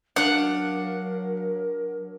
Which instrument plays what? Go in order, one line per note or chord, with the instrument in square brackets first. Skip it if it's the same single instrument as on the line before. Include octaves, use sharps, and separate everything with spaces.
[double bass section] F#3 [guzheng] D4 F5 [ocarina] A#4 [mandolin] F#5